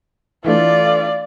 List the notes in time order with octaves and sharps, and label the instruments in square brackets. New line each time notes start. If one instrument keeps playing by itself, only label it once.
[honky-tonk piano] E3 A3 D4 [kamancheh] F4 D5